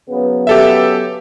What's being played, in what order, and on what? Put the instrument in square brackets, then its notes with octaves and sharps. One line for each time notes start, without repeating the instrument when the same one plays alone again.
[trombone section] C#3 F#3 B3
[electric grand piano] G4 A4 E5